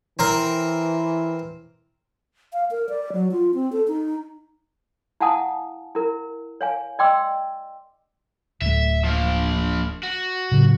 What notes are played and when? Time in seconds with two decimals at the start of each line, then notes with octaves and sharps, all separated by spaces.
0.19 E3 C4 A#4
2.53 F5
2.71 A#4
2.89 D5
3.13 F#3
3.32 F4
3.54 C4
3.72 A4
3.88 D#4
5.20 E4 F5 F#5 G#5 A5 D#6
5.95 E4 A#4
6.61 C#5 F5 G#5
6.99 D5 D#5 G5 C6 D6 E6
8.61 D1 A3 E5
9.04 F3 A#3
10.03 F#4
10.51 A2 C#3 F#3